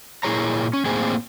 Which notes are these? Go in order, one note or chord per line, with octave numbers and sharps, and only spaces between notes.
A#2 F3 E4 G#4 C#5 A#5
C#4
A2 A#3 C4 G#4